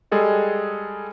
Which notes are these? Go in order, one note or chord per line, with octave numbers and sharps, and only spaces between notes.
G3 G#3 G#4 A4 D#5